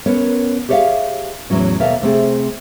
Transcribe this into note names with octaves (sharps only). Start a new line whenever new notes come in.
B3 C#4 A#4 C#5
G4 G#4 C#5 D5 E5 F5
E2 A2 F#3 C#4
D#2 B2 A#3 A4 E5 F5
C3 A3 C4 G#4